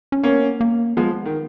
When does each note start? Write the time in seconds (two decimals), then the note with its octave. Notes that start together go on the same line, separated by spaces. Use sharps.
0.12 C#4
0.23 A#3 B3 C#4
0.61 A#3
0.97 F3 G#3 B3
1.25 D#3